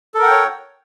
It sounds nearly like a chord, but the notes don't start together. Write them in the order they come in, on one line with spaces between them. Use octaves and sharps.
A4 A#4 F#5 G5 C#5